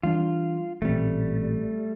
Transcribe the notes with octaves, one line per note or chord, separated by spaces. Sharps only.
E3 G3 D4 F4
A1 A#2 G3 A3 C4